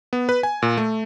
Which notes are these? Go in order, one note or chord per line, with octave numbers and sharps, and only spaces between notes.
B3
B4
G#5
A#2
A3